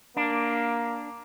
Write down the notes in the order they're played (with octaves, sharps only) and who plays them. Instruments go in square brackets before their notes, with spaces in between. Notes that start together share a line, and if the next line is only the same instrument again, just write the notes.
[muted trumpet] A#3 [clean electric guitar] D4